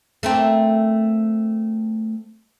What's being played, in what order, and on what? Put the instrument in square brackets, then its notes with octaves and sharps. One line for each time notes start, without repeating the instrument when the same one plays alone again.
[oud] A3 A#3 C4